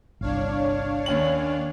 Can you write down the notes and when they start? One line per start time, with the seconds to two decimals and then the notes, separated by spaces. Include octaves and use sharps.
0.21 G1 C2 D4 C#5 F5
1.06 D#2 C#4 F#7